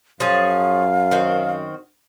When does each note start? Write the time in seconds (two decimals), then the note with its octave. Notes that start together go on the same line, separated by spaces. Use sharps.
0.20 F#2 F3 G#4 C#5 F5
1.11 D#3 C4 F#4